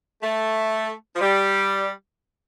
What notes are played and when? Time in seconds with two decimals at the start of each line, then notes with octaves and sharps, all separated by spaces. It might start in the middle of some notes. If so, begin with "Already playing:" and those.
0.22 A3
1.16 F3
1.20 G3